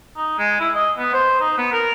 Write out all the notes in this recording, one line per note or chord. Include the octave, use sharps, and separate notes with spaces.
D#4
G#3
E4
D#5
B3
C5
D#4
B3
A#4